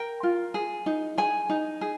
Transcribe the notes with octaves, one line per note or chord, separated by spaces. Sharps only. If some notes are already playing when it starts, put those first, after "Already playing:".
Already playing: A#4 G5
F4
G#4
D#4
G#4 G#5
D#4
G#4